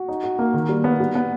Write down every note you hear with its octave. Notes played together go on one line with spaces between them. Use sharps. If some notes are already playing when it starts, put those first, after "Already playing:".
Already playing: F#4
D#4
F#4
A#3
D#3
G3
B3
G3
B3